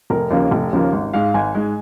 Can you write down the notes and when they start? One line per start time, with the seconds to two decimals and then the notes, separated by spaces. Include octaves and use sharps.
0.10 F1 A#4
0.30 D#2 C#3 F3 A#3
0.51 F1
0.73 D#2 C#3 F3 A#3
0.92 G#1
1.14 G#2 G#3 F5
1.34 G#1 G#5
1.55 G#2 G#3